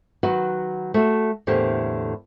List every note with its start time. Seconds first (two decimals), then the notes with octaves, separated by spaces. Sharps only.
0.23 D#3 F#3 F#4 B4 F#5
0.94 A3 F#4
1.47 E2 A2 D3 A#3 G4 C5